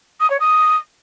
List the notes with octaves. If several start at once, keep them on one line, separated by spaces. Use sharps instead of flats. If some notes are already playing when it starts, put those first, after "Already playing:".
D#6
C#5
D#6